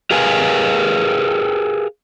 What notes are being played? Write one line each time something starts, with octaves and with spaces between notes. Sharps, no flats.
G4 G#4 A#4 B4 F5 G#5